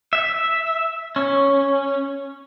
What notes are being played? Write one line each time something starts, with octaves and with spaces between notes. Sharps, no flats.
E5
C#4